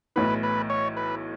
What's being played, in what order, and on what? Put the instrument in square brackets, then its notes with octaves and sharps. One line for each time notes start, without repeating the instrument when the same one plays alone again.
[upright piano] B1 A2 E3 [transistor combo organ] B4
[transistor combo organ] B4
C#5
B4